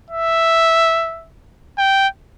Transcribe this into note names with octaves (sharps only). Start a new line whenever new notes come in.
E5
G5